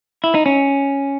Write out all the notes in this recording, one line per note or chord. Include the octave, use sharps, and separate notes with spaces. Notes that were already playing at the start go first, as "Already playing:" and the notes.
E4
D#4
C#4